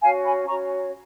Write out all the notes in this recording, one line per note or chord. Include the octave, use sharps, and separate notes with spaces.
C#4 F#4 C#5 F5 G#5
G#5 B5
C#4 F#4 C#5 A#5 C#6